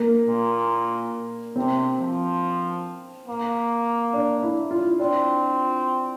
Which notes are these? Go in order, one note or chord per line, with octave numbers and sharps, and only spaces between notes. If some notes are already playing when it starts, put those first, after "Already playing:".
Already playing: A#3
A#2
C3 C4
F3
A#3
D4
E4
F4
C4 D4